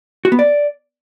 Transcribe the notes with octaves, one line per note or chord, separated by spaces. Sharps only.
F#4
B3
D5